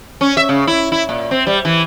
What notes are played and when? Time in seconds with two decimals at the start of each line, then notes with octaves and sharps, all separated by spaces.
0.21 C#4
0.37 E5
0.49 C#3
0.67 E4
0.92 E4
1.09 A#2
1.31 C4
1.47 G3
1.65 E3